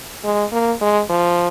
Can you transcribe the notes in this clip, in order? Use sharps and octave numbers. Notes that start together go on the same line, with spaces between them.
G#3
A#3
G#3
F3